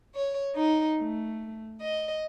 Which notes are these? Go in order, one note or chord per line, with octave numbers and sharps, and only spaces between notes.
C#5
D#4
A3
D#5